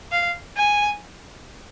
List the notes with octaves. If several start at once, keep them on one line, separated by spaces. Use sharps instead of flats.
F5
G#5